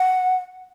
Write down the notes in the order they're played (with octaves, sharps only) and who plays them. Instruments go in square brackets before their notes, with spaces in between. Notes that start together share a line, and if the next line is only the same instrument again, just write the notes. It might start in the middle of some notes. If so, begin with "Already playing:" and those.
Already playing: [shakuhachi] F#5